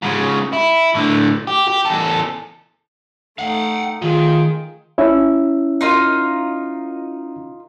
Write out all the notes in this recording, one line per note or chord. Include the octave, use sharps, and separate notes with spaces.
G#2 C#3
E4
A2 D3
G4
G4
E2 A4
A3 D#4 F5 F#5
D#3 F4 G#4 G5
C#4 E4 E5
D#4 F4 A#4